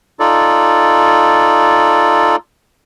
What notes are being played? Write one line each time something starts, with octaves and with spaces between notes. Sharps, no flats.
D#4 F4 A4 D5